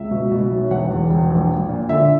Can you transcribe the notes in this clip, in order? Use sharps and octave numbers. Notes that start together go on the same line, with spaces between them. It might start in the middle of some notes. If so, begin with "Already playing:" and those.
Already playing: C#2 E5
B2
B2
B1
E1 F#5
E2
E1
A#1
A#1
A#2
D3 E5